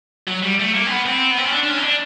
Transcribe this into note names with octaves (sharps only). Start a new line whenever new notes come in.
F#3
G3
A3
A#3
C4
B3
C4
B3
C4
C#4
D4
D4
C#4
D#4
D4